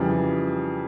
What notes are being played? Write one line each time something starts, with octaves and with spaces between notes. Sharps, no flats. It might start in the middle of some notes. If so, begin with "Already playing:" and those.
Already playing: F2 C#3 E3 G3